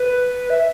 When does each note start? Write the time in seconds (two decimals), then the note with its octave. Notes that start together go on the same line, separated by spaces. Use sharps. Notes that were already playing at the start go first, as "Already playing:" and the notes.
Already playing: B4
0.50 E5